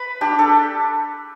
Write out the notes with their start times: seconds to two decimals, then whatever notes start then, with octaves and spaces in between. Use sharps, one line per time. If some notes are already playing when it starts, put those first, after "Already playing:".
Already playing: B4 B5
0.21 D4 G4
0.39 A4